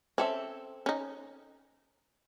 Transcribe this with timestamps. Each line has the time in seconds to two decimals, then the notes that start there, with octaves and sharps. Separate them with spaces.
0.18 C4 C#4 A4 E5
0.86 C#4 D#4